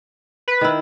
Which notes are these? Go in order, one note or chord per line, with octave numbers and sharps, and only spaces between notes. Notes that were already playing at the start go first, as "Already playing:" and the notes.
B4
D#3 E4